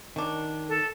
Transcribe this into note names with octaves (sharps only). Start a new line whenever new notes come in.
D#3 F#3 D4
A4